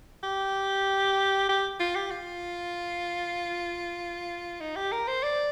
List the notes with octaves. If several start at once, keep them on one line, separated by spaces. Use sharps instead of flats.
G4
G4
F4
G4
F4
D#4
G4
A#4
C5
D5